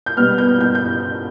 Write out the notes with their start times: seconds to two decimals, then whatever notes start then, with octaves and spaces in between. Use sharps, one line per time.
0.06 G6
0.16 B2 G3 B3 F6
0.38 G6
0.60 G6
0.75 G6